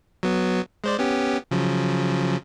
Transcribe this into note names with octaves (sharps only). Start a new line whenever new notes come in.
F#3 B3
G#3 C5 D5
B3 C#4 G4
C#3 F3 F#3